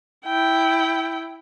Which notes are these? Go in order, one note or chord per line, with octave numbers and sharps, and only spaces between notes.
E4 G5